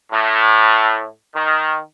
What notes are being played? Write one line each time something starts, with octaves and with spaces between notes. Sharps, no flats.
A2
D#3